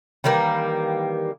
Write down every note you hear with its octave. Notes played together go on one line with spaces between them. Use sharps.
D#3 E3 G3 A#3